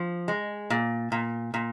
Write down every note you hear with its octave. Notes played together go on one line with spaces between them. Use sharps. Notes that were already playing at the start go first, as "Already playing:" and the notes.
Already playing: F3
G#3
A#2
A#2
A#2